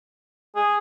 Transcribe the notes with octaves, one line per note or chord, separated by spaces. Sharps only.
G#4